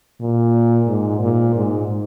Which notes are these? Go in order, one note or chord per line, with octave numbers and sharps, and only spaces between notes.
A#2
G#2
A#2
G#2